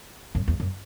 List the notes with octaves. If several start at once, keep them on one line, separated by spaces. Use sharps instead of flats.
F#2
E2
F#2